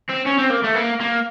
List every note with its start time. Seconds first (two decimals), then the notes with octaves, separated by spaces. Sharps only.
0.10 C4
0.27 C#4
0.39 C4
0.51 A#3
0.64 A3
0.75 A#3
1.01 A#3